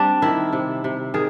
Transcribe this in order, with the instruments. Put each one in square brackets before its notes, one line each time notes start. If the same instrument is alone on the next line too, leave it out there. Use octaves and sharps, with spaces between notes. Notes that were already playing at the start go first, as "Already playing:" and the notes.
Already playing: [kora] G3 C4 D4
D#3 E4
C3
C3
D#3 G#4